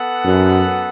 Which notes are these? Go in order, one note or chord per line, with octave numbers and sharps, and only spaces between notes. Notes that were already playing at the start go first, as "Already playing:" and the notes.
Already playing: B3 A4 F#5
F#2